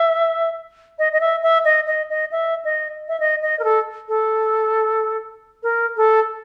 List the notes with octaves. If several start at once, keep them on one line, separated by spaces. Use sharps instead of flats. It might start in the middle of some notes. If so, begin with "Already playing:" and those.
Already playing: E5
D#5
D#5
E5
E5
D#5
D#5
D#5
E5
D#5
E5
D#5
D#5
A#4
A4
A4
A#4
A4